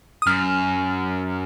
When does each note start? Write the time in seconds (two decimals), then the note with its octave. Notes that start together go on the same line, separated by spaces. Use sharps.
0.22 D#6
0.27 F#2 F6